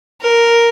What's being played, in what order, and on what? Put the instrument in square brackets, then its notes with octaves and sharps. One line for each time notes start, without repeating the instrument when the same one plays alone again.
[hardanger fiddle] A#4